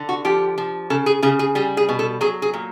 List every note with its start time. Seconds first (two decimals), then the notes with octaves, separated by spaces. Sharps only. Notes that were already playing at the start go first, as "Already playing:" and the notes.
Already playing: D3
0.09 F#4
0.25 F3 G4
0.58 F3
0.90 C#3 A4
1.06 G#4
1.23 C#3 G#4
1.39 G#4
1.55 G3 G#4
1.77 G#4
1.89 B2
1.99 A4
2.21 F#3 G#4
2.42 G#4
2.54 A#2